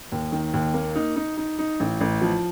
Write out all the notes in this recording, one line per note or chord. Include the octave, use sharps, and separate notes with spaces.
D#2
D#3
D#2
A#3
D#4
D#4
D#4
D#4
A1
A1
F3